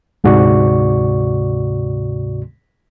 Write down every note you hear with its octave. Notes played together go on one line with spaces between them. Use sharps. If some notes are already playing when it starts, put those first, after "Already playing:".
D2 G#2 C3 F#4 D5 C#6